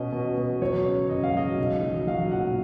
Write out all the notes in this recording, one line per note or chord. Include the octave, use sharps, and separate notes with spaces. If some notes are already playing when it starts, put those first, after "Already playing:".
Already playing: B2 C#4 D#5
B2
B2
F#3 C#5
C#3
F#1 D#5
F5
F#3 D#5
B1
F#3
F#3 F5
A#2 F#5